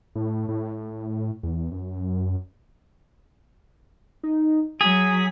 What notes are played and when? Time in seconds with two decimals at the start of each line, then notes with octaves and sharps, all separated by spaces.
0.15 A2
0.49 A2
1.43 E2
1.72 F#2
4.23 D#4
4.81 F#3 G#4 B6